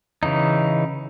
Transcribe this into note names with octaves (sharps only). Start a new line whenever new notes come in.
C#3 E3 D#4